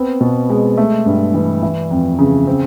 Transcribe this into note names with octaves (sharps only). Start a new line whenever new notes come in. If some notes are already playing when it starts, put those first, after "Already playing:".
Already playing: B3 C4
B2
G#3
A3
G2
E3
E3
F2
C#3
C4